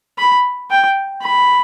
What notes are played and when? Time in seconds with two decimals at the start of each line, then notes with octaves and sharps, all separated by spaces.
0.18 B5
0.70 G5
1.23 B5